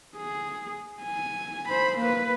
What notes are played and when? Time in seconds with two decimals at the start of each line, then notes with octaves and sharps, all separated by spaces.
0.16 G#4
1.03 G#5
1.68 C5 B5
1.98 A#3 B4